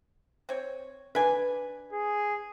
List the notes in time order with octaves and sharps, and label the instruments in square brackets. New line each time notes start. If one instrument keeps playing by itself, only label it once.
[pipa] C4 C#5
[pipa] D4 G#5 [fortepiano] B4
[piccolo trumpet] G#4